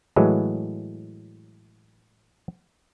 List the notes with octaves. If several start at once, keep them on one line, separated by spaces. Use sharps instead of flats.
A2 E3 F#3 G#3